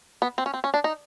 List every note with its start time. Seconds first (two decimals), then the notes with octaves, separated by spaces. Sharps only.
0.22 B3
0.38 C4
0.46 C#4
0.54 C4
0.64 C#4
0.74 D4
0.84 D#4